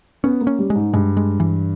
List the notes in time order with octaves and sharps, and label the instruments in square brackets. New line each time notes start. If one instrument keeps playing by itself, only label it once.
[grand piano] B3 [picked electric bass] C#4
[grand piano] A#3
[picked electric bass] C#4
[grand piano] G3
[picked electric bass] G#3
[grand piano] G#2
[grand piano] G2 [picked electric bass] G#3
[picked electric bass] G#3
E3